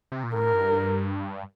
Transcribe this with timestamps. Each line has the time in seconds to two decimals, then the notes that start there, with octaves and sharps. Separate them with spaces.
0.12 C3
0.23 A#2
0.34 A2 A#4
0.53 G2